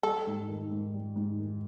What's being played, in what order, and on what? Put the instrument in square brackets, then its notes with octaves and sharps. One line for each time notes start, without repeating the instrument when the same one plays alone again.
[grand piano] G3 [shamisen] A4
[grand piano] G#2
D#3
G#2
G3
G#2
D#3